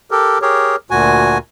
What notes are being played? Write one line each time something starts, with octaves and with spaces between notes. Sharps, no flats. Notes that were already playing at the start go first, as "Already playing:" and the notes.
G4 A4 A#4
G4 G#4 A#4 C#5
D2 A#2 F#4 G#5